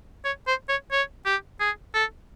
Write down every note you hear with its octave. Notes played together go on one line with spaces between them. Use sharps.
C#5
C5
C#5
C#5
G4
G#4
A4